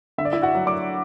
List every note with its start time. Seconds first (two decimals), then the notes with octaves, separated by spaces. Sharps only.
0.18 D3 E5
0.25 D5
0.33 E4 E5
0.42 F#4 F#5
0.55 F#3
0.66 D5 D6